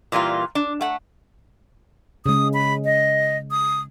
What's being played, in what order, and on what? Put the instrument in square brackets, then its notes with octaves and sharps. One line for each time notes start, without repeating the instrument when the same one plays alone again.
[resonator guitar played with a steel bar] A#2 E3 G3 A#3 F4
D4
A3 F#5
[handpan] C#3 G#3 [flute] D#6
[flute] B5
D#5
D#6